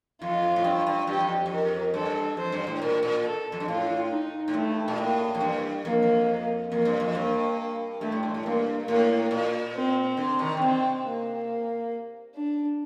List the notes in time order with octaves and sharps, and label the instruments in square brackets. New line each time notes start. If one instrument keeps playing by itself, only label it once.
[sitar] F2 [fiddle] F4
[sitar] A2
G2
G2
[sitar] G2 [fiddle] G4
[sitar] F2
F2
[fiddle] A#4
[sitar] G2 [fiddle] A4
[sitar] F2 [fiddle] C5
[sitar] G2
A2
[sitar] A#2 [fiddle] A#4
[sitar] A#2
[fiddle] A4
[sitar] F2
G2
[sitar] A2 [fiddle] F4
[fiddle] D#4
[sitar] A2
[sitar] G2 [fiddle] A3
[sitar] A#2
[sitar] A2 [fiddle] A#3
[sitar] F2
G2
[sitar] F2 [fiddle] A#3
[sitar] F2
[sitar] F2 [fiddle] A#3
[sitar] G2
F2
[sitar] G2 [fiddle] A#3
[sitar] G2 [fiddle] A3
[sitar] A2
G2
A2
[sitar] G2 [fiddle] A#3
[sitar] A2 [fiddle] A#3
[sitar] A#2
[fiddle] C4
[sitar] D3
C3 D#3
D3
[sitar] C3 [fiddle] C4
[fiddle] A#3
D4